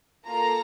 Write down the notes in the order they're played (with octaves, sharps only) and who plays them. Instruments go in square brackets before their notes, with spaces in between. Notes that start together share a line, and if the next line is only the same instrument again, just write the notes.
[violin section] A#3 F4 A4 A#5